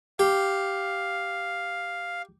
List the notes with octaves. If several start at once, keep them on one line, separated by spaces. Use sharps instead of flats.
G4 F5